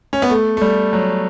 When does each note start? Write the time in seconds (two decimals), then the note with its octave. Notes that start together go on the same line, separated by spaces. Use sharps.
0.13 C#4
0.22 B3
0.30 A3
0.57 A3
0.61 G3
0.93 F#3